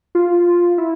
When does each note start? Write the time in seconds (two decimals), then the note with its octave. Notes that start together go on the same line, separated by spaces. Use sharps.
0.15 F4
0.78 E4